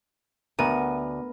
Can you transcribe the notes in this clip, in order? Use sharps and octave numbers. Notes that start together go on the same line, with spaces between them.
D2 B3 A#4 D#7